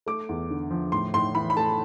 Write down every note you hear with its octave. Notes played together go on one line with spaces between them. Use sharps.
A3 D6
E2
D3
F3
A2 C6
A2 C6
E3 B5
B5
A3 A5